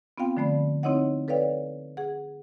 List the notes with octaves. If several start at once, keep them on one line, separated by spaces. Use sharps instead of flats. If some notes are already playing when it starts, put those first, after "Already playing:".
B3 C4 F4 F5 G5
D3 F3 A3 D5 B5
C4 D#4 E4 C#5 D#5 F#5
A4 B4 C#5 D5 F5 G5
G#4 F#5